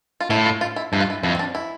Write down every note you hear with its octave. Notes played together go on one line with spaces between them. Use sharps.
F4
A2 E4
F4
F4
E4
G2 E4
F4
E4
F2 E4
C4
D4
E4